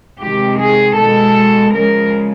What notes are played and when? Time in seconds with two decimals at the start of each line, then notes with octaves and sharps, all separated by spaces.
0.21 C3 D#3 G#3 G4
0.60 G#4
0.98 B2 G#3 A4
1.75 C#3 F3 G#3 A#4